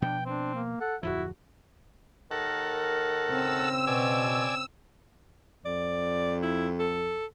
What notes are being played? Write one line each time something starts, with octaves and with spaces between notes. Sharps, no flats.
B2 F3 B3 D4 G5
C4 D4
A#3
A4 F#5
D1 F2 F3 E4 F#4
D#2 D#3 A4 A#4 F#5
C#3 C4 E6
B2 D5 G#5
F2 D5
E4
A4